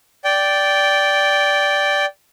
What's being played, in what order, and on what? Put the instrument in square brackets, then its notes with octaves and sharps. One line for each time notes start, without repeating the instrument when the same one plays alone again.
[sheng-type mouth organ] D5 G5